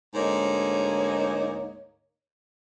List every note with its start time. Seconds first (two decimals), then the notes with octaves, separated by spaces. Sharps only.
0.15 D2 G#2 A#3 D#4 C#5